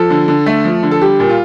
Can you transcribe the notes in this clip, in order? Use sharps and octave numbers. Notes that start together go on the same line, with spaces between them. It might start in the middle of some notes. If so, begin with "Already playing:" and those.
Already playing: F3 A4
D3
D3
A3
F3
D3
A4
G3 G4
A#2
F4